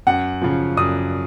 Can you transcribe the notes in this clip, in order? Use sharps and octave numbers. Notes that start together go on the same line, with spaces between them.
F#2 F#5
C#3 F3
F#2 D#6